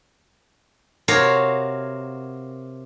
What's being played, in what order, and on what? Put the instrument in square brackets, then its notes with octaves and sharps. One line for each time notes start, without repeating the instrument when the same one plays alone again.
[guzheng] C3 F#4 A#4 C#5 F5